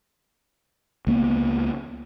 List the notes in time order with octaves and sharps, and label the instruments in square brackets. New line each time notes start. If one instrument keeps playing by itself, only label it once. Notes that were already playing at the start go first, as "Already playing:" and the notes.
[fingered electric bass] C#2 A#3 B3